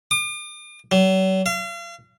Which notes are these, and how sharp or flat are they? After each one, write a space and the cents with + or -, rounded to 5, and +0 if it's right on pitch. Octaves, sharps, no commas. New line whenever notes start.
D6 +45
F#3 +40
F5 -40